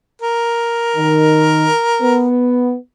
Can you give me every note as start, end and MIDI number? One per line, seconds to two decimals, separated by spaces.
0.22 2.25 70
0.96 1.66 51
2.01 2.73 59